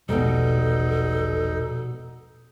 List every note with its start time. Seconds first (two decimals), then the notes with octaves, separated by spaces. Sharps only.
0.09 E1 A#1 B2 G3 D#4 A4